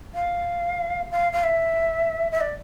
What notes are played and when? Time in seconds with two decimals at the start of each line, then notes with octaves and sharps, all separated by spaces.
0.14 F5
1.11 F5
1.33 F5
1.44 E5
2.32 E5
2.41 D5